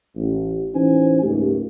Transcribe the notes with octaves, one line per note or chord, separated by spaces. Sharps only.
A1
A1 E3 C#4 D#4 C5 G#5
F#1 C#2 G#2 A3 G4